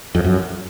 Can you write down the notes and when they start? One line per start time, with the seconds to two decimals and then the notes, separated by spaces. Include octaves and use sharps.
0.15 F2
0.24 F#2